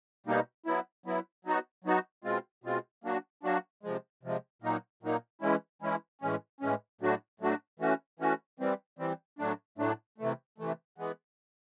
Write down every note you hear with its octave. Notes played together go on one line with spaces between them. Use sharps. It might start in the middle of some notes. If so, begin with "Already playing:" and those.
B2 G3 A#3 D#4
F#3 B3 E4
F#3 B3 E4
F#3 B3 D#4 F#4
F#3 B3 D#4 F#4
B2 G#3 C4 F4
B2 G#3 C4 F4
F#3 A#3 D4 F#4
F#3 A#3 D4 F#4
C3 F3 G#3
C3 F3 G#3
A#2 F#3 A#3 D#4
A#2 F#3 A#3 D#4
E3 G#3 C#4 E4
E3 G#3 C#4 E4
A2 E3 G#3 C#4
A2 E3 G#3 C#4
A2 F#3 A3 D4 F#4
A2 F#3 A3 D4 F#4
E3 A3 C#4 F#4
E3 A3 C#4 F#4
E3 G3 C4
E3 G3 C4
A2 F#3 A3 D4
A2 F#3 A3 D4
C3 E3 A3
C3 E3 A3
E3 G#3 B3